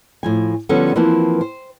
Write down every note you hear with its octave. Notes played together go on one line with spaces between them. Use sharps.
A2 F3 G#5
D3 F3 G3 B3 C#4 A4
E3 F3 A#3 C4 B4 A5
C5